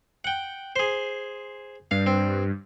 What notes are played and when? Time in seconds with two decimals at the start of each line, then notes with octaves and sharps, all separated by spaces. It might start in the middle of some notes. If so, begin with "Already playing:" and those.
0.25 F#5 G5
0.76 G#4 C5
1.91 G2 F5
2.06 C4